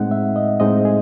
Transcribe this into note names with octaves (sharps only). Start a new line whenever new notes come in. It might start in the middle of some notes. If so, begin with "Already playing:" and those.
Already playing: A2 G#3 C4 D#4 F#5
E5
D#5
A2 G#3 C4 D#4 D#5
G#4